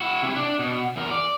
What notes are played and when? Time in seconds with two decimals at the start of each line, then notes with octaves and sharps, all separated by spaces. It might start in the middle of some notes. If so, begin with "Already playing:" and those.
0.01 E4 F#4
0.22 C3 E4
0.36 D4 D5
0.59 B2
0.96 E2 A#4
1.11 D5